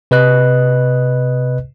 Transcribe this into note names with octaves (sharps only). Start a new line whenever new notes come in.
C3 B4 D#5 F#6